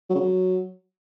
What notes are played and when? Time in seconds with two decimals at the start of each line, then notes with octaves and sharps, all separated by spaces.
0.10 F#3
0.15 C#3
0.20 F#3